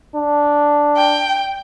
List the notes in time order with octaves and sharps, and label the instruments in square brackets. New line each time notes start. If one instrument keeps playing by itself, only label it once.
[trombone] D4
[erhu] G5